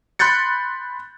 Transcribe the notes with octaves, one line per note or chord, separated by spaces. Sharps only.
B5 C6 F#6 G6 A6 C#7